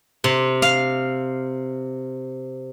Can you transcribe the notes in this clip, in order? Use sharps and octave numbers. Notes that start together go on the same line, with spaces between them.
C3
F5